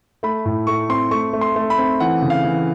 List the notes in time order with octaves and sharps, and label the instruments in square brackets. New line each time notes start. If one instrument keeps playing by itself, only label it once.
[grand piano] A3 B5
A2
A3 C#6
C4 C6
A3 C#6
A3
C6
A3
B5
C4
E3 F#5
C#3
F5
E3